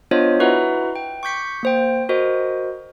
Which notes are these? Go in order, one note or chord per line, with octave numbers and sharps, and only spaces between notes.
B3 D4 F4 C5 C#5 D#5
E4 F#4 B4 E5 F#5 A#5
G5
C#6 D6 G6 B6 C#7
A#3 C5 G5
F#4 A#4 C5 D#5